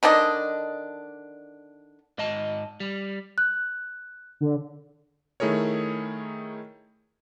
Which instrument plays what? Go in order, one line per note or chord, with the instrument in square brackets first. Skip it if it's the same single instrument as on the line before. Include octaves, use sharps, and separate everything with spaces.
[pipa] D3 D#3 D4 D#5
[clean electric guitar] G#2 D#5 A5
G3
[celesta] F#6
[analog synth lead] D3
[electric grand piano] D#3 A3 E4 G#4 A#4 C#5